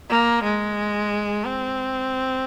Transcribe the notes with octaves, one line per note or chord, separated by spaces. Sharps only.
A#3
G#3
C4